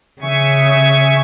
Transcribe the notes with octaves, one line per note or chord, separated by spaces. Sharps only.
C#3 E5 G#5 C#6